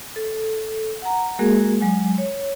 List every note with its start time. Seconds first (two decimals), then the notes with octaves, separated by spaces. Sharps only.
0.16 A4
1.02 F#5 A#5
1.39 G#3 A#3 F#4 G#4 A#4
1.81 F#3 G#3 G#5
2.18 C#5